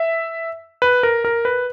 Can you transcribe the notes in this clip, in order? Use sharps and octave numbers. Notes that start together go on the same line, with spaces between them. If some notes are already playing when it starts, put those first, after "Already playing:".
Already playing: E5
B4
A#4
A#4
B4